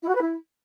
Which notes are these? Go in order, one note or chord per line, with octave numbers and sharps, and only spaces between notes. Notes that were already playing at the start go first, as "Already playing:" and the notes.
E4
F#4
B4
E4